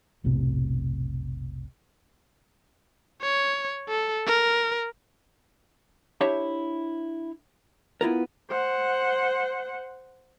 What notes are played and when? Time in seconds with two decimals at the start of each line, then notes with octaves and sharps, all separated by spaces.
0.24 F1 B1 A2 C3
3.22 C#5
3.89 A4
4.27 A#4
6.21 D4 E4 G4 C5 C#5 E5
8.01 B3 E4 F4 A#4
8.50 C5 F#5